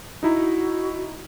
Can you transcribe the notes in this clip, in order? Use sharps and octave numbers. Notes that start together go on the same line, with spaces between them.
D#4 E4 F#4 A#5